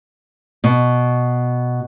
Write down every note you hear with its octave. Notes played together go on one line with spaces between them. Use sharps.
B2